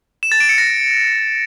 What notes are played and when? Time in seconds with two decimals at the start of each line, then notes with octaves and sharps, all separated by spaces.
0.23 E7
0.32 A6
0.40 D7
0.49 C#7
0.58 A#6